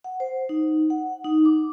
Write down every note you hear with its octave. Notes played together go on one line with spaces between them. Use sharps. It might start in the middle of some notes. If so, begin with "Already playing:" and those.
F#5
C5
D#4
F#5
D#4
D6